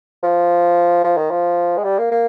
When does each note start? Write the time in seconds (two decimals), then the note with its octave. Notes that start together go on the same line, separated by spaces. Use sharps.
0.23 F3
1.04 F3
1.17 D#3
1.30 F3
1.77 G#3
1.84 G3
1.99 A#3
2.11 A#3